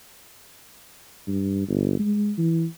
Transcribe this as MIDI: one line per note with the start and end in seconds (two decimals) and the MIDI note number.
1.28 1.68 43
1.68 1.99 31
1.99 2.32 56
2.38 2.66 52